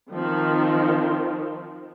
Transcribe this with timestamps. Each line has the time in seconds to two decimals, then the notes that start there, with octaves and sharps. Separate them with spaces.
0.12 D#3 F3 C4